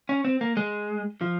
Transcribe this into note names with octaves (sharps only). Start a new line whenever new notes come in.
C#4
C4
A#3
G#3
F3